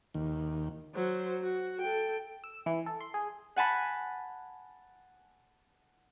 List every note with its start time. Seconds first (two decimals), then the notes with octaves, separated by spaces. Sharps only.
0.14 D#2
0.95 F#3 C5
1.42 F#4
1.82 A4 G5
2.44 E6
2.66 E3
2.86 A4
3.01 C6
3.14 G#4
3.56 F#5 G#5 A5 B5